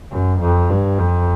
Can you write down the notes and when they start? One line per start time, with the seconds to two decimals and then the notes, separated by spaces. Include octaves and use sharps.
0.11 F#2
0.40 F2
0.69 G2
0.98 F2